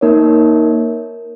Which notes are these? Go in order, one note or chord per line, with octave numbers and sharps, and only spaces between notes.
A#3 D#4 A#4 C#5